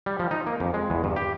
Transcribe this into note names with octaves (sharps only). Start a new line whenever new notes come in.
G3
F3
D#4
A#3
F2
G#3
E2
G2
G4